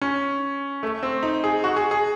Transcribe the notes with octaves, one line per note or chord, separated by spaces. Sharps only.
C#4
A3
C4
D#4
G#4
F#4
G#4
G#4